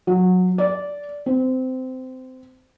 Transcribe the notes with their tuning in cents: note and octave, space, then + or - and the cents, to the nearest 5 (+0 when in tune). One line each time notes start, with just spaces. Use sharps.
F#3 -20
D5 -15
C4 -20